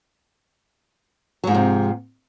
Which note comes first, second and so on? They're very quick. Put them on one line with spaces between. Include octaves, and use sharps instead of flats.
F#3 G#2 F3 C3